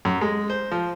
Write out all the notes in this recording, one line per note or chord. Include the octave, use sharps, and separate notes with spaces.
F#2
G#3
C5
F3